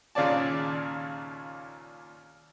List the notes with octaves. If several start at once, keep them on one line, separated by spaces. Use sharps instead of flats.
D#2 A#2 C#3 C#5 D5 A5